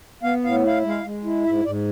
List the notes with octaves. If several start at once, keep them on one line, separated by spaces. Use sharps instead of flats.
B3 F5
A2 F5
E4 F5
G#3
F5
G#3
E4
G#2 E5
G#2 D5